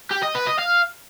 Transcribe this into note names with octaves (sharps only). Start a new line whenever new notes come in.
G4
D#5
B4
D#5
F5